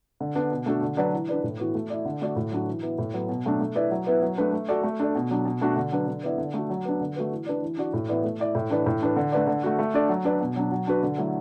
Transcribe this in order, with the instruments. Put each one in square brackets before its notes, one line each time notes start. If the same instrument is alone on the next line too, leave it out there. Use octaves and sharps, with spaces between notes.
[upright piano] D3
B3 D4
B2
A3 D4 F#4 A4
D3
F#3 D4 B4 D5
E3
D4 B4 D5
A2
E3 B3 F#4
A3
E4 D5
D3
A3 F#4 D5
A2
F#3 D4 F#4
E3
B3 E4
A2
F#3 B3
B2
F#3 A3 D4
A3
E4 B4 D5
F#3
B3 E4 B4
F#3
A3 D4 B4
A3
F#4 A4 D5
A3
D4 A4 D5
B2
F#3 D4
B2
A3 D4 F#4
D3
F#3 D4 B4
D3
B3 E4 D5
D3
A3 D4 F#4
F#3
B3 D4
D3
A3 F#4 B4
E3
D4 B4 D5
E3
D4 F#4 D5
A2
E3 B3 E4 D5
A3
E4 D5
A2
E3 D4 B4 D5
A2
E3 D4 B4
D3
A3 D4 B4 D5
D3
A3 F#4
A3
D4 A4 D5
F#3
D4 B4 D5
B2
F#3 D4
F#3
D4 F#4 B4
D3
F#3 A3 E4